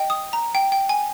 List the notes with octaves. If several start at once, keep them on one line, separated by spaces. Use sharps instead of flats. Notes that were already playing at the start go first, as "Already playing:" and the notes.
Already playing: D#5 G5
D#6
A#5
G5
G5
G#5